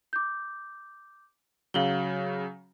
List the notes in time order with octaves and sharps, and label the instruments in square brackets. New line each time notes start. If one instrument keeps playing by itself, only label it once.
[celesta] D6 G6
[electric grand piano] C#3 F#3 [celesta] F5 F#7 G7